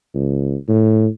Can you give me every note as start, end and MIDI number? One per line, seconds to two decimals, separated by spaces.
0.14 0.55 37
0.68 1.07 45